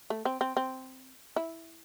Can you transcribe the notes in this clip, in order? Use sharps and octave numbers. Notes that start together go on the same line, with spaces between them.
A3
C4
C4
C4
E4